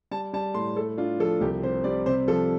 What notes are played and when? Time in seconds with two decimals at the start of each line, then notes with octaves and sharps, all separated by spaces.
0.11 G3 A5
0.33 G3 A5
0.54 A2 C6
0.76 A3 A4
0.97 D4 F4
1.20 F3 A4
1.41 C2 G4
1.62 C3 C5
1.84 G3 D5
2.06 C3 C5
2.28 F3 A4